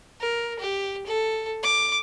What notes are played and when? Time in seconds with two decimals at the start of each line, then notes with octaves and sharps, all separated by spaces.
0.20 A#4
0.59 G4
1.06 A4
1.63 D6